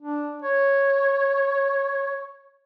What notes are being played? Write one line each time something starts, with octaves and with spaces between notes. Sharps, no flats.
D4
C#5